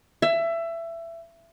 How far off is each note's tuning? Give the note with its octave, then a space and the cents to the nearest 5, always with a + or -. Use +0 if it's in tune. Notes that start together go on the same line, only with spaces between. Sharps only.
E5 +20